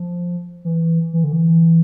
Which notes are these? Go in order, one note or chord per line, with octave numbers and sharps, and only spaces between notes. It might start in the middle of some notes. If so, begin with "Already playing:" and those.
Already playing: F3
E3
E3
D3
E3